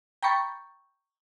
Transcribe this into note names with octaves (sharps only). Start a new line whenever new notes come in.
G5 A#5 B5 C#6 G6 A6